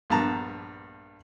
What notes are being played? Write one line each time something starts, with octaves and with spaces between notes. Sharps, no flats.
A#1 G2 B3 A5 A#5